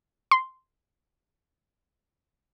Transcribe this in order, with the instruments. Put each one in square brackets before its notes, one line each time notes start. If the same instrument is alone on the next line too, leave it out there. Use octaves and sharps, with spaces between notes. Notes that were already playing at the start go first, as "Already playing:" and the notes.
[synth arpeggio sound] C6